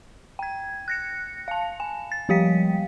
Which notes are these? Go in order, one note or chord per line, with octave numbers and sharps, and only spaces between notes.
G5 G#6
F#6 A#6 C#7
F5 A5
G#5
A6
F3 G3 G4 F5 G5 B6